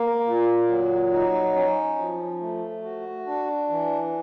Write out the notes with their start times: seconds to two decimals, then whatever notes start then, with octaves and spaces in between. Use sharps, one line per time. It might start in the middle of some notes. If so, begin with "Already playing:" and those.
Already playing: A#3
0.25 A#2
0.68 F#3
1.11 D#4
1.55 C#4
1.97 F3
2.40 A3
2.83 F#4
3.26 D4
3.69 E3